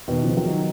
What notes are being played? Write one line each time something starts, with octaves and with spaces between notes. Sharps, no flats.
B2 D#3
C#3 F3
D#3 F#3